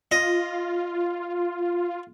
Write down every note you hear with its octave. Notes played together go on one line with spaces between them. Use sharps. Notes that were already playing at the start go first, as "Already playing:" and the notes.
F4 D#5